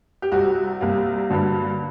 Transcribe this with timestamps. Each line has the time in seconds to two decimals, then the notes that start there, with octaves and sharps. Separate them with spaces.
0.22 G4
0.32 C2 C3 G3 F#4
0.81 C2 C3 G3 A#3
1.30 G2 D3 F#3